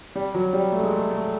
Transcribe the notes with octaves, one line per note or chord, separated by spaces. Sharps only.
G3
F#3
G3
A3
G#3
A3
A3